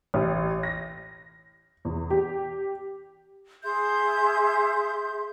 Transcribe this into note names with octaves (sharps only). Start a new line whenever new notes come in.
A1
A#6
E2
G4
G#4 E5 C6 G6